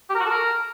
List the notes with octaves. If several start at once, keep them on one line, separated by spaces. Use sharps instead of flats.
G4
A#4
F#4
A4
A#4